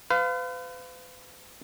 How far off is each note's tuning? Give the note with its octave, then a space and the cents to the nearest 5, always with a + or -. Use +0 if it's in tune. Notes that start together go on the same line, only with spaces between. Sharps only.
B4 +45 F5 +0